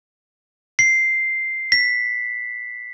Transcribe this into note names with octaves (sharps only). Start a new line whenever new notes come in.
C7
B6